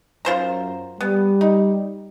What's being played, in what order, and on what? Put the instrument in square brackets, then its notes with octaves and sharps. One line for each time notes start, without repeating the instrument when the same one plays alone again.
[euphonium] F#2 [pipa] F4 C5 A#5
[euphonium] G3 [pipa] B3
[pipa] D#4